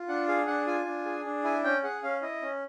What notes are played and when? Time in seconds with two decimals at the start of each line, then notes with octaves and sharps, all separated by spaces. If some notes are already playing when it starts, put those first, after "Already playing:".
Already playing: F4
0.08 D4 F#5
0.28 G#4 F5
0.47 D4 F#5
0.67 F4 G#5
0.86 D4
1.05 G#4
1.25 D4
1.44 E4 G#5
1.64 C#4 G5
1.83 G#4 F#5
2.03 C#4 F5
2.22 E4 D#5
2.42 C#4